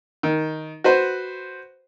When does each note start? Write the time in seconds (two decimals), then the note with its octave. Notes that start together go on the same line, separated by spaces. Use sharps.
0.23 D#3
0.84 F#4 B4 C5